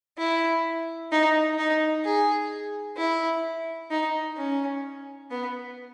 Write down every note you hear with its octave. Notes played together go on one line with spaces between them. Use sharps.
E4
D#4
D#4
G#4
E4
D#4
C#4
B3